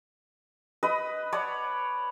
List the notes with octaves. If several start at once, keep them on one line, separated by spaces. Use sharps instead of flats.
B4 D#5 D#6
C#5 D5 F#5 A5